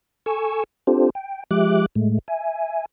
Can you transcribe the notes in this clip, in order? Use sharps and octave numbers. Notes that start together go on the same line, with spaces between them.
A4 G#5 C#6 E6
C4 D4 F4 G4 A4 C5
G5
F3 G#3 G4 E5 D6 F#6
A2 G#3 A3
E5 G#5